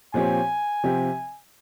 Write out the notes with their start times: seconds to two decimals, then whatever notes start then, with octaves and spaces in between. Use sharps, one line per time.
0.14 A#2 F3 C4 G4 C#5 G#5
0.84 C3 F3 C4 G4